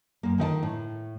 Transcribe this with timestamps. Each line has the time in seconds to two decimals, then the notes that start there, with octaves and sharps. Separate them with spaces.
0.23 F#2 A#3
0.38 D3 D#3 F5 A5
0.63 A2